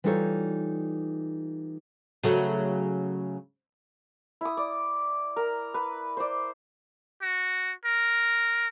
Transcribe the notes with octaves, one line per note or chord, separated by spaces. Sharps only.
E3 G3 D#4 F4 A4 C#5
C#3 F#3 A3
E4 D#6
D5
A#4
B4
C5 D5
F#4
A#4